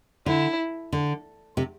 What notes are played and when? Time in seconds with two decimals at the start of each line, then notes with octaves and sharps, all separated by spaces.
0.26 D3 E4
0.92 D3
1.57 C3